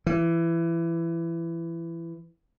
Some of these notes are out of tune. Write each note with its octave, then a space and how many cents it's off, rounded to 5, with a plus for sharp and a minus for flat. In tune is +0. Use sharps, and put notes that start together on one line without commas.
E3 +20